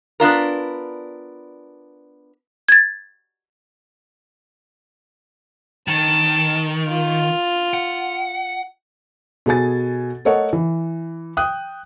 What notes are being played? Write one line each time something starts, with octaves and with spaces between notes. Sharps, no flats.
B3 D4 F4 A#4
G#6 A6
D#3 A5
F4
F#5
B2 G#4 A4 G#5 A6
A3 A4 A#4 C#5 D#5 F#5
E3
G5 D#6 F#6